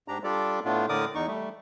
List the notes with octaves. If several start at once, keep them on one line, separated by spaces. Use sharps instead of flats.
G#2 D4 G4 A#5
G3 D4 F4 G4 A4 D5
A2 A3 B3 D4 F4
A2 D3 A#4 D5 D6 D#6
E2 D#4 C#6
G3 A3